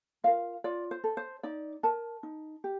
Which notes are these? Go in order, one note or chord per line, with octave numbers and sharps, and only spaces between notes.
F4 A#4 F5
F4 D5
C5
A4
C5
D#4 D5
A#4 A5
D#4
G4